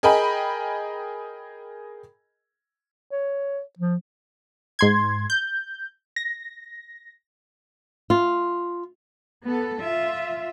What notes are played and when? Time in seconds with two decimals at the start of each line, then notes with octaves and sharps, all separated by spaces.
0.03 G#4 A#4 D#5 G5 G#5 B5
3.12 C#5
3.79 F3
4.79 G#2 C6 G#6
5.30 G6
6.16 A#6
8.10 F4
9.45 B3 A4
9.82 F4 E5